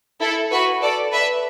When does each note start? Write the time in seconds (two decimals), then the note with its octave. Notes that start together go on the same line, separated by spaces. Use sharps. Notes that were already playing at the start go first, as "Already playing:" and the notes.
0.21 E4 A4
0.51 F#4 B4
0.82 A4 D5
1.12 B4 E5